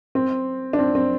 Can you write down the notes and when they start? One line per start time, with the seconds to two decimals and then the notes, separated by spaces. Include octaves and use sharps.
0.15 C4
0.73 D4
0.79 C4
0.95 C4